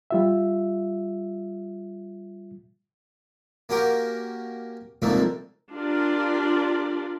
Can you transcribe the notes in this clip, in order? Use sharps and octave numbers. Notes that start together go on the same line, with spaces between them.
G3 F4 E5
A#3 C#4 F#4 G4 A#4
C2 F2 G#2 F3 A3 A#3
D4 F4 G4 A#4 D5